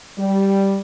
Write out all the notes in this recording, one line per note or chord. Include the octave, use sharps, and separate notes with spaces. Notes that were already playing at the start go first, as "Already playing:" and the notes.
G3